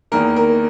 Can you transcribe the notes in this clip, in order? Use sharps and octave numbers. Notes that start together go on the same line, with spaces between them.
E2 D#3 A#3 A#4
A#4